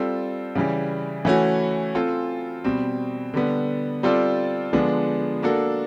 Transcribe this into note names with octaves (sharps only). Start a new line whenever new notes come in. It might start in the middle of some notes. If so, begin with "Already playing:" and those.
Already playing: G3 C4 F4 A4
C#3 E3 G3
E3 A3 C#4 F#4
C4 F4 A4
B2 G3 C4
D3 G3 B3
G3 C4 F4 A4 D5
D3 F3 G#3 B3 D4
A#3 D4 F#4 A4